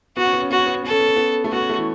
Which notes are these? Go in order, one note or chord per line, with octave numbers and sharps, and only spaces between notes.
B3 F#4
C#4
B3
C#4
B3 F#4
C#4
B3
C#4
B3 A4
C#4
B3
C#4
B3
A3
B3 F#4
C#4
A3
E3